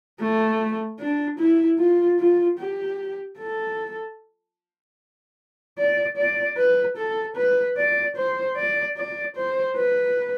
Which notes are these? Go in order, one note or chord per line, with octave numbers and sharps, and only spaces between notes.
A3
D4
E4
F4
F4
G4
A4
D5
D5
B4
A4
B4
D5
C5
D5
D5
C5
B4